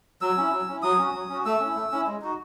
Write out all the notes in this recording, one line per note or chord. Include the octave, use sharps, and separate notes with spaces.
F#3 E6
C#4 E4
F#3
C#4 E4
F#3 D#6
C#4 F#4
F#3
C#4 F#4
A3 E6
C#4
E4
A3
C#4 E4
G#3
D#4 F#4